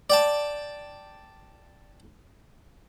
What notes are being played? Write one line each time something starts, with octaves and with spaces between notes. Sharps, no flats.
D5 G5 A5